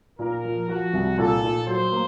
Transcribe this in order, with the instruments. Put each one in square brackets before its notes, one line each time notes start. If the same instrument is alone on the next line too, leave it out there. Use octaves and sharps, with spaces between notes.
[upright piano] A#2 [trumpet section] A#4
[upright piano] F3
[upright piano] F3 [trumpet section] F#4
[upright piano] C2
[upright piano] A#2 [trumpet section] A4
[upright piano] A#2
[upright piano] F#3 [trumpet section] C5
[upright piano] A#3